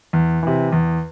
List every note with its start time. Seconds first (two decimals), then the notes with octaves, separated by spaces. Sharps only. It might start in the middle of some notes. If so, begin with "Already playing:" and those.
0.13 E2
0.43 C3 E3
0.72 E2